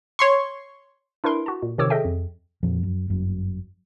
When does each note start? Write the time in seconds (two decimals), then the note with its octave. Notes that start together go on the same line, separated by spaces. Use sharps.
0.19 C#5 C6 C#6
1.24 D4 E4 A#4 B4 C6 D7
1.46 F#4 A5
1.63 A#2
1.78 C3 D#3 F3 C#5 D6 E6
1.90 G#4 A4 D#5 E5 G5
2.05 F2
2.63 F2 A#2 F3
2.83 F#2
3.08 G1 F#2